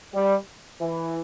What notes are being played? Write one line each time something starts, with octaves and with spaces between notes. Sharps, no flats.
G3
E3